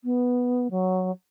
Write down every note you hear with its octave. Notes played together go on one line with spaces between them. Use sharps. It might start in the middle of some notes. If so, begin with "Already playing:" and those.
B3
F#3